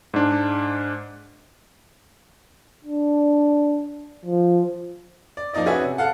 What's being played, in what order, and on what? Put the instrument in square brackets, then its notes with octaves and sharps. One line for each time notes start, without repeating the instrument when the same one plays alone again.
[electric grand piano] G#2 D4
[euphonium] D4
F3
[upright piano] D5
F3 A#3 D#4 D5 D#5
C#4 F#4 G#4 B4 E5
C3
A4 F5 F#5